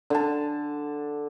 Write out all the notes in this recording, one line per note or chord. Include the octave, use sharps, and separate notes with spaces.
D3 A5